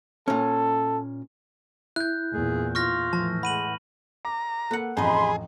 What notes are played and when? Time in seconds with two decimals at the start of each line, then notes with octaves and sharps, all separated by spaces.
0.28 A#2 C#4 A4
1.96 E4 F#6 G6
2.33 E2 A#2 G#4
2.75 F4 C#6 F6 A#6
3.13 A2 E3 F3 A5
3.43 G#3 F#5 B5 D#7 F#7
4.25 A#5 D6
4.71 A#3 A4 B4 F#5
4.97 A1 F2 D#4 G#4 D#5 B5 C6